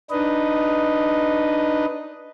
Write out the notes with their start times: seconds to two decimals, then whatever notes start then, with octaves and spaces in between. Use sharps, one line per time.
0.11 D4 D#4 B4 D#5